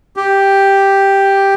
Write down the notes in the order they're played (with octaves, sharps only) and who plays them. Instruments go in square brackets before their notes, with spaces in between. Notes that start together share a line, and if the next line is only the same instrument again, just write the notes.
[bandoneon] G4